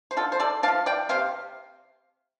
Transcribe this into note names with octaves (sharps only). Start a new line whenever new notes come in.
C5
D3 F4 A4
C5
A4 D5
D4 F5 A5
F3
D5 G5
C3 C5 F5